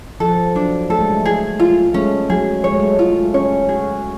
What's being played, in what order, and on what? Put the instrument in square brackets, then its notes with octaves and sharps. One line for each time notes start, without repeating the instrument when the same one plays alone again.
[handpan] F3 [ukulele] A4
[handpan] F#3 [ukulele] D4
[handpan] A3 [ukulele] A4
[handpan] G#3
A3
[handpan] A3 [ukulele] G#4
[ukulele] F4
[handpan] A3
[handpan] G#3 [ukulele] C#4
[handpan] F#3 [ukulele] G#4
[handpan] G#3 [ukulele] C#5
[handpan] A3
G#3
[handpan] A3 [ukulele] F4
[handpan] C#4 [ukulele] C#5
[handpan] F#4 [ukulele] G#4